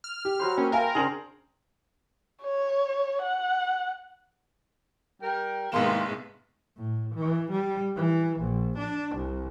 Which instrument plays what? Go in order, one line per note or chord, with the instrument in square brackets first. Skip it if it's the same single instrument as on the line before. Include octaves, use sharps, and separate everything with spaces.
[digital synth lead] F6
[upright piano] G4
[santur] F#3 B4 C5
[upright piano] A#3 [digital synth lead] C#4 [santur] G5
[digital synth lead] A#4 [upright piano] E5 F5 G#5
[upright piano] C#3 D4 F#7 [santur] G#4 C5
[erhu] C#5
F#5
[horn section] G3 A#4 G5
[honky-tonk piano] C2 C6 E7 [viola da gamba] G#2 B3 [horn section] D#3 A#3 G#4
[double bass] A2
E3
G3
E3
A#1
D4
C2